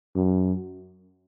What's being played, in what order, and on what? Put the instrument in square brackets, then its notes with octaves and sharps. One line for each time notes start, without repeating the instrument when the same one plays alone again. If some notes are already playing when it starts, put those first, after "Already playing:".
[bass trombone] F#2